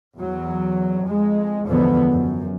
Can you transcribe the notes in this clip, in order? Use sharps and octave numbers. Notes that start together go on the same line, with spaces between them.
E2 F#3
F2 G#3
E2 G#2 D3 F3 B3
F#2